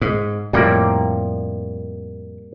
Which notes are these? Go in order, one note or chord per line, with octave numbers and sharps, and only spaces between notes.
G#2
F2 A2 G3 A#3 D5